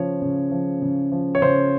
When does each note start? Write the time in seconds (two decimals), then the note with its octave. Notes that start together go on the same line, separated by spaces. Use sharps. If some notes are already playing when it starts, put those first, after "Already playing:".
Already playing: C#3 F3 C#5
0.22 C#3
0.51 F3
0.82 C#3
1.12 F3
1.35 C#5
1.42 C#3 C5